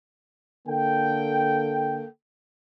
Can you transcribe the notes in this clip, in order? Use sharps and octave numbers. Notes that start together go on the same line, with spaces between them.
D3 A#3 A4 G5